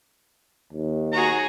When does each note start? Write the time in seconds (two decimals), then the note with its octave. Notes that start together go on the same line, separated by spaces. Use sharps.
0.73 D#2
1.12 F#4 G#4 A#5